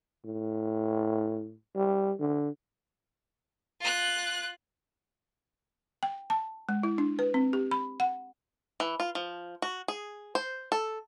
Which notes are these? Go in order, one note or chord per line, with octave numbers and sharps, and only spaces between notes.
A2
G3
D3
F4 F#6
G5
A5
G#3
E4
D4
B4
C4
G4
B5
F#5
E3
F4
F3
F#4
G#4
C5
A4